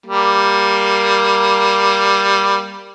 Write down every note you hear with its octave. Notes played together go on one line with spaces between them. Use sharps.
G3 A#3